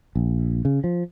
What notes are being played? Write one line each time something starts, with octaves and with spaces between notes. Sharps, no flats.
A#1
C#3
F3